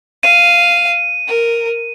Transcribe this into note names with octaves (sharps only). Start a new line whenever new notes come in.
F5 D#7
A#4